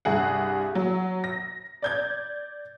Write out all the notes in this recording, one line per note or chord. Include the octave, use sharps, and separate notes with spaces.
C2 G2 G#4 F#5
F#3
A#6
D5 G6 G#6